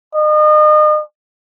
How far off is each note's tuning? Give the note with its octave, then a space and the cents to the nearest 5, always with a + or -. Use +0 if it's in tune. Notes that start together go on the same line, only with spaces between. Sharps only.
D#5 -35